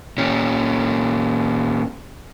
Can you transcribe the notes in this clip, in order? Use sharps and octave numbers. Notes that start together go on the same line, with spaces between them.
A#2 C#4